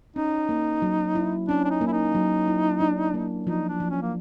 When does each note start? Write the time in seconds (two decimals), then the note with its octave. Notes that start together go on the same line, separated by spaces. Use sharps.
0.16 C#4 D#4
0.49 A#3
0.82 F#3
1.15 E4
1.48 C#4 D4
1.64 D4
1.71 D#4
1.81 A#3
1.87 E4
1.93 D#4
2.15 F#3
2.48 E4
2.80 D4
3.14 A#3
3.47 F3 D#4
3.69 D4
3.80 F3
3.91 C#4
4.02 A#3